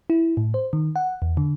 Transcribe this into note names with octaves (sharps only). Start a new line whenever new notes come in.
E4
A2
C5
D#3
F#5
E2
D3